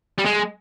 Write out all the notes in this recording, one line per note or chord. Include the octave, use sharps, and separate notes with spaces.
G3
G#3